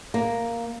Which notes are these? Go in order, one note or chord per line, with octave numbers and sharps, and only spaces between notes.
A#3